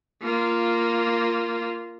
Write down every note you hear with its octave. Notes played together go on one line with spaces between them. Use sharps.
A#3 F4